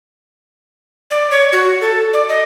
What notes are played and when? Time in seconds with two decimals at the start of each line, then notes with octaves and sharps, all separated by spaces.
1.11 D5
1.31 C#5
1.52 F#4
1.81 A4
2.13 D5
2.29 D#5